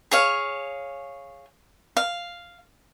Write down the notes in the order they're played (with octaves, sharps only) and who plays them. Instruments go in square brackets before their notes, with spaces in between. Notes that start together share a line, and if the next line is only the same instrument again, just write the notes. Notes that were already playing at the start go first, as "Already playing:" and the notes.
[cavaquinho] G#4 C#5 F5
F5